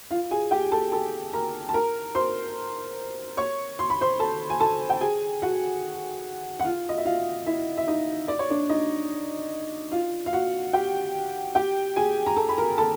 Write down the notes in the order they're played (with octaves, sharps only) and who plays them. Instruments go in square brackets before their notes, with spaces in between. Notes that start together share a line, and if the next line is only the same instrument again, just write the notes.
[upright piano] F4 F5
G#4 G#5
G4 G5
A4 A5
A4 A5
A#4 A#5
A5
A#4 A#5
C5 C6
C#5 C#6
C6
B5
C5 C6
A4 A5
G#5
A4 A5
G5
G#4 G#5
F#4 F#5
F#5
F4 F5
D#5
E5
F4 F5
E4 E5
E5
D#4 D#5
D5
C#5
D4 D5
D#4 D#5
F4 F5
F5
F#4 F#5
G4 G5
G4 G5
G#4 G#5
A#5
A4 A5
B5
A#4 A#5
A4 A5